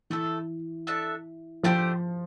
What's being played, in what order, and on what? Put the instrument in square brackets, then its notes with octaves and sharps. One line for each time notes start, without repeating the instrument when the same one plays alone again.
[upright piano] E3 [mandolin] A3 E4 A4
[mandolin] D4 A4 E5 A5
[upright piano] F3 [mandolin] A3 D4 G4 C5